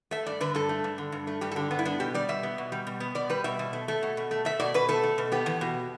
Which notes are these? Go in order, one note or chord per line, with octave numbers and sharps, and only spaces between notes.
A3 E5
G2 D5
D3 B4
G2 A4
A3
G2
D3
G2
A3
G2 G4
A4
D3 G4
G2 B3
E4
B3 D4
B2 G4
G3 D5
B2 E5
B3
B2
G3
B2
B3
B2 D5
G3 B4
B2 E5
B2
A3
A3
B2
B2
A3
A3 E5
B2 D5
B2 B4
A3 A4
A3
B2
B3 G4
E2
B2